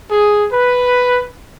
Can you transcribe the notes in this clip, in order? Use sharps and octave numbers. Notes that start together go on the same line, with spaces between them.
G#4
B4